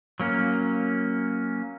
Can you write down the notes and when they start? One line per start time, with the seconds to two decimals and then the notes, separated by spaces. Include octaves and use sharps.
0.20 F#3 A#3 C#4